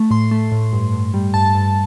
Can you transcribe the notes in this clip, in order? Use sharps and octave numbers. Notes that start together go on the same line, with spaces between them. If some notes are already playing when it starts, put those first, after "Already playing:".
Already playing: A3
A2 C6
A3
A2
G2
G2
G3
G2 A5
G2